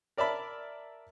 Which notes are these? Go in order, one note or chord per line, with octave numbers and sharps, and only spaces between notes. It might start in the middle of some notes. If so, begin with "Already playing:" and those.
A#4 D5 E5 A5 B5